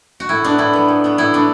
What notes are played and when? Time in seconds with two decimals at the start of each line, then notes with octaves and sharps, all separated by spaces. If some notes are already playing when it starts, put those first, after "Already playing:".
0.20 F#4
0.29 A2 E4
0.44 F#3 B3 D4
0.58 A2 E4
0.73 F#3 B3
0.88 A2
1.04 F#3 B3
1.18 A2 E4
1.33 F#3 B3 D4